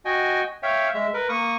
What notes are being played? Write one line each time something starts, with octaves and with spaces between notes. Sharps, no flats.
F#4 D#5 G5 G#5
C#5 E5 F5 G5
G#3 E5
A#4 B4
A#3 C#6 D#6